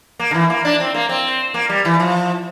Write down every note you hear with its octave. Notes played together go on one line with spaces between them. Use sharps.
A#3
D3
E3
A#3
D4
C4
A#3
C4
A#3
G3
E3
F3